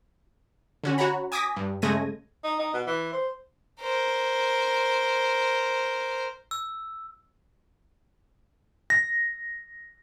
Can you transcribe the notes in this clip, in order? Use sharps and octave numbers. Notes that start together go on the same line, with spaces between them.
D3 C#4 F#4
F#4 C#5 F#5 A#5 B5
G#5 D6 D#6 G#6 A#6 B6
G2
C#3 G#3 A3 G#6 A#6 D#7
D#4
D#4
B2
E3
C5
A#4 C5
E6
A#6